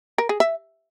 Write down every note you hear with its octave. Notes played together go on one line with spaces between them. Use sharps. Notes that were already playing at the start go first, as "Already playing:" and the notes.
A#4
G#4
E5